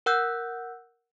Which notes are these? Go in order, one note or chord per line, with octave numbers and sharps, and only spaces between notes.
A#4 F#5 E6 F#6 G6